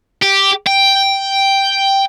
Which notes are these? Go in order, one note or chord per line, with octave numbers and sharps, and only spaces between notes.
G4
G5